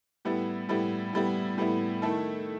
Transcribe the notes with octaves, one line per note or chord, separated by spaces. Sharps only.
A2 G3 B3 E4
A2 G3 B3 E4
A2 G3 B3 E4
A2 G3 B3 E4
D#3 A3 E4 A4